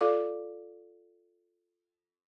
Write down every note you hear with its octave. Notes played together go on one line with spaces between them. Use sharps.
F4 A4 D5 F5 D6